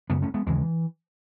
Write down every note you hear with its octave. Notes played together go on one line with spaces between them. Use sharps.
F#2 C#3 G#3 B3
A3 C#4
G#3 B3
D#2 C#3 E3 G#3